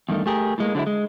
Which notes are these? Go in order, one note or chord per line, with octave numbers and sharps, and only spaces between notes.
E2 G2 D#3 A3
A3 G4 G#4 A#4
A2 G#3 A#3
D3 F#3 G#3 E4
G#3